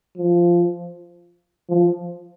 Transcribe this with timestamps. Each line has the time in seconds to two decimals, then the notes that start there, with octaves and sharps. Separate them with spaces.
0.18 F3
1.70 F3